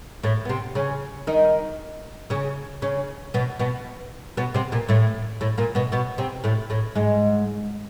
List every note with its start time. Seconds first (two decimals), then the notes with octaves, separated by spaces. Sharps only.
0.23 A2 A3
0.45 B3
0.49 C3 C4
0.75 C#3 C#4
1.27 D#3 D#4
2.30 C#3 C#4
2.82 C#3 C#4
3.34 B2 B3
3.59 B2 B3
4.37 B2 B3
4.54 C3 C4
4.72 A#2 A#3
4.89 A2 A3
5.41 A2 A3
5.58 A#2 A#3
5.75 B2 B3
5.92 B2 B3
6.18 C3 C4
6.44 A2 A3
6.70 A2 A3
6.95 G#2 G#3